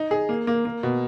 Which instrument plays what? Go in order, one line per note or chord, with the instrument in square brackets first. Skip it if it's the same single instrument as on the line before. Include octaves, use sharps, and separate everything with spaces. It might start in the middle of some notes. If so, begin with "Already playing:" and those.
Already playing: [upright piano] D#4
G#4
A#3
A#3
A#3
B2